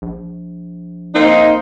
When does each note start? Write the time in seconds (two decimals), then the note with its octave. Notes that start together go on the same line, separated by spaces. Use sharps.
0.02 A#1
1.15 A#3 C4 D#4